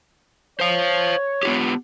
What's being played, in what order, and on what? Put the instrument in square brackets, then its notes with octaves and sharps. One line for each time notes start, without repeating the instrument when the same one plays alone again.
[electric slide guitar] C5 F5 [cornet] C#5
[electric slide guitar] B3 F4 G4